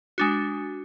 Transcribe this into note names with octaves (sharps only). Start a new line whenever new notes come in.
G#3 D4 F#4